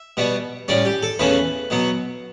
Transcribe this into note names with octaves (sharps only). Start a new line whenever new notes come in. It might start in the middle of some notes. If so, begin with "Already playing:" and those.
Already playing: E5
B2 G3 B3
A2 G3 C#4 D5
G4
A4
E2 C#3 E3 A3 C#4 B4
B2 F#3 B3